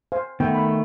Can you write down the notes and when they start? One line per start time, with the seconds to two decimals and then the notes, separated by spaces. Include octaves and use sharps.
0.12 C5 F5 G#5
0.40 D#3 A3 B3 G5
0.54 B5